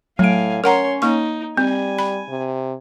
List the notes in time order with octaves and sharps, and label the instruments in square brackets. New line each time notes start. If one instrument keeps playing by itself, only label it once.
[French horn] A2 [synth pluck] F#3 D7 [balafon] A3 [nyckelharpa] F5 G#5
[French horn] C#4 [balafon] A#4 F#5 A#5 [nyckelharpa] C#5 C6
[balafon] A#3 C#6 [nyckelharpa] D#4
[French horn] G3 [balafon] C4 [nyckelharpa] G#5
[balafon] B5
[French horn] C3